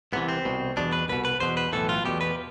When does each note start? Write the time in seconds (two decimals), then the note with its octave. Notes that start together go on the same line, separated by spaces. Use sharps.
0.12 C2 C3 E3 B3
0.29 C4
0.45 C2 B2
0.77 E2 B2 D4
0.92 B4
1.09 C2 B2 B4
1.25 B4
1.40 E2 B2 C5
1.57 B4
1.73 B1 A2 E3 A4
1.89 F4
2.05 E2 B2 G4
2.21 B4